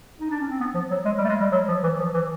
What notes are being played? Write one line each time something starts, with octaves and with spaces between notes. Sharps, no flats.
D#4
D4
C#4
C4
B3
F3
F#3
G#3
G3
A3
G#3
G3
F#3
F3
E3
F3
E3